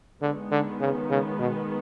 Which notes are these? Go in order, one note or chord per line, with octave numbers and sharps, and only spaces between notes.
D3 D#3 G#3 B3
D3
C#3
C#3
B2